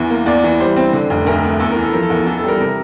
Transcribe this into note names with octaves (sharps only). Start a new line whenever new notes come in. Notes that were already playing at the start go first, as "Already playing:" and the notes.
Already playing: E2 E3
A#3
E2 D5
E3
G3 C5
C4
D3
F1
D2 A#4
A3
E2 A4
A#4
E3
A4
F3 A#4
A4
E2 A#4
E3 A4
A4
G3 A#4
C3 A#4